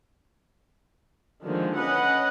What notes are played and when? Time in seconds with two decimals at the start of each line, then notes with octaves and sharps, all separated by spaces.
1.46 D3 D#3 F3 G#3 A#3
1.78 C#4 B4 D#5 F#5